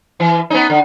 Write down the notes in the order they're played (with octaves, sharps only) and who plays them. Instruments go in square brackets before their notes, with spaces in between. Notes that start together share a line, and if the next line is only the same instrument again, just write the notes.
[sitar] E3
B3 C#4 D#4
D3